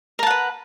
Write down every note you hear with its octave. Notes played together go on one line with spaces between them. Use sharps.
A#4 B4 F#5 A5